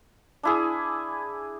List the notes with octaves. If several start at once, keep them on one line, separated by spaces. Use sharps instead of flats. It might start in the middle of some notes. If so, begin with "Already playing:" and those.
D4 E4 G#4